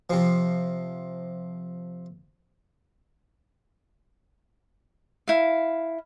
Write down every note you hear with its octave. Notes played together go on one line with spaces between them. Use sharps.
C3 F3
E4 F5